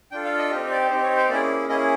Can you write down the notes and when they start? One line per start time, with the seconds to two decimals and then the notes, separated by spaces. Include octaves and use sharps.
0.11 D4 F4 A4 G5
0.25 F5
0.38 D#5
0.51 G4 D#5
0.53 C4 D#4
0.71 D5
0.90 C4 D#4 G4 C5
1.03 C#5
1.17 C5
1.29 A#3 C#4 E4 G#4 D5
1.69 A#3 C#4 E4 G#4 D#5